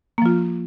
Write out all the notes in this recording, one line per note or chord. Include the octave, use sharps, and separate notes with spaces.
F3 A#3 F4